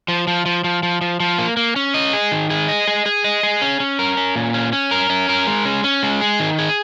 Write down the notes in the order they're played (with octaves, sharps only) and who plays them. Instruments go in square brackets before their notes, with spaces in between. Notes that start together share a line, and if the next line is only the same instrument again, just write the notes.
[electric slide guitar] F3
F3
F3
F3
F3
F3
F3
A#3
A#3
C#4
D#5
G#4
D#3
G#4
D#5
G#4
G#4
D#5
G#4
C#4
C#4
A#4
C#4
A#2
C#4
C#4
A#4
C#4
A#4
G#3
C#4
C#4
G#3
G#4
D#3
G#4